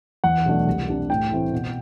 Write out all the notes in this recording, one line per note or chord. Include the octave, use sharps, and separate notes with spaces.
E2 F#5
B2 F#3 A3 D4
C2
C3 G3 D4
A2 G5
E3 A3 C4 E4
B2